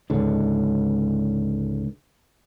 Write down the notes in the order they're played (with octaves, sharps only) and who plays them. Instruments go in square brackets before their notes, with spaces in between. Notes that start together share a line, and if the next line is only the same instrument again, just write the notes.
[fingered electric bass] C#2 G#2 D3